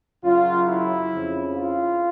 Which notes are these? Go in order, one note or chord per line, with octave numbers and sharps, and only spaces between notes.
F#2 C#3 F#3 F4
E4
F2 C#3 F3
F4